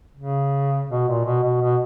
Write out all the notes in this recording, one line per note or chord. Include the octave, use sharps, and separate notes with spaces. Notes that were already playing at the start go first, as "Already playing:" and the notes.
C#3
B2
A#2
B2
B2
B2